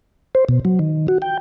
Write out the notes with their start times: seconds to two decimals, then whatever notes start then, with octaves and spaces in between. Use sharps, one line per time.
0.35 C5
0.49 B2
0.65 F#3
0.79 D#3
1.08 F#4
1.22 G5